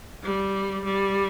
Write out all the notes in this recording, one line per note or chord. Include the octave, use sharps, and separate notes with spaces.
G3
G3